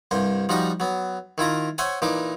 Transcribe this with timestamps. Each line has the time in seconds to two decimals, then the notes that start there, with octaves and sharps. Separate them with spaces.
0.11 C2 G2 C5
0.49 F3 G3 D#4 F#4 A#5
0.80 F#3 B3
1.38 D#3 E4 F4 A#5
1.78 C5 C#5 E5 F#5 G#5
2.02 A#2 E3 D#4 D6